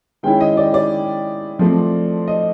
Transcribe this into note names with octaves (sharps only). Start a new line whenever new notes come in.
D#3 G#3 C#4 E4 G5
D#5
D5
D5
F3 A3 C4
D#5